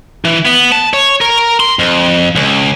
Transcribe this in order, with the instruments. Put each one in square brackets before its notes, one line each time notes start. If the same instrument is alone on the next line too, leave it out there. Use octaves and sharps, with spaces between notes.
[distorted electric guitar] E3
B3
A5
C#5
A#4
C6
F2
C#2